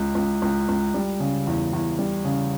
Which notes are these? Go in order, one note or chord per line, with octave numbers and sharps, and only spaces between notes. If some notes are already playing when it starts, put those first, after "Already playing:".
Already playing: C#2
C#2
C#2
C#2
G3
C#3
E2
E2
G3
C#3